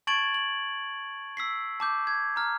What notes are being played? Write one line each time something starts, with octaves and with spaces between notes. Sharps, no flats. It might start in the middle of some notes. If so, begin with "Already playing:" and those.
A5 C#6 G#6 A6 D7 F#7
F#7
E6 B6 C7
A5 D6 G6
G#6
A#5 F6